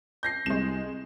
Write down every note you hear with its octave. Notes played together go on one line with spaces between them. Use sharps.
G6 A#6 C7
C2 G#3 E7